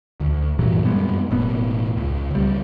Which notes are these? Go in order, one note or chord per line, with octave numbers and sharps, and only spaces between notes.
D2
G2 A#2 E3 F#3
F#2 G3 G#3 B3
E1 A2 B3
C#2
C#2 G3